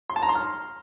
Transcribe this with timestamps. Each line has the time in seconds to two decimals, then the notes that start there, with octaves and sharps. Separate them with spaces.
0.10 C6
0.16 A5
0.22 A#5
0.29 C6
0.35 F6